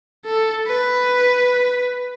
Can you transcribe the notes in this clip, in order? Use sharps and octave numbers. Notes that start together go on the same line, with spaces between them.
A4
B4